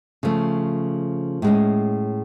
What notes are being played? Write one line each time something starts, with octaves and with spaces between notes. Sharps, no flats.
C#3 F3 A3
A2 G#3 C#4